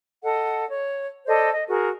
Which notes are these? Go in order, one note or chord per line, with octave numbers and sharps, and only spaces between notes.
A4 D#5 F#5
C#5
A4 C5 D5 D#5
D#5
F#4 G#4 A#4